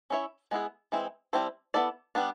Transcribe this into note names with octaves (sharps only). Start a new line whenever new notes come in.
C#4 E4 G#4 C#5 E5
G#3 B3 E4 G#4
E3 G#3 C4 E4
G3 C4 E4 A4 C5
B3 E4 A4 D5
G3 B3 D4